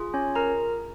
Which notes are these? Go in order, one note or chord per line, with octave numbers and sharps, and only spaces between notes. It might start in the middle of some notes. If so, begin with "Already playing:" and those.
Already playing: F4 G#4
C#4 C#5
A#4 A#5